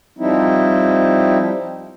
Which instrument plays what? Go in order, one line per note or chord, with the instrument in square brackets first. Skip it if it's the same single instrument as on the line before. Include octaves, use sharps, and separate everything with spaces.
[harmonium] F3 G3 C4 D#4 E4